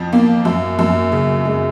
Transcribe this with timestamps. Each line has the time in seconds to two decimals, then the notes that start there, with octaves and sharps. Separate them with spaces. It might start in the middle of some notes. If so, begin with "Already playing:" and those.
Already playing: F2 F3
0.12 A#3
0.45 F#2
0.79 F#2
1.12 C#3
1.45 G#3